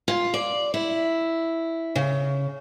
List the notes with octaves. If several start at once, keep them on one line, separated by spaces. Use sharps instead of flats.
F4
D5
E4
C#3